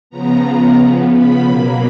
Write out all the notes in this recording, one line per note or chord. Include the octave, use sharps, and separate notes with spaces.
C#3 F3 B3 A#5
C#3 F3 B3
B5
B2 F#3 A#3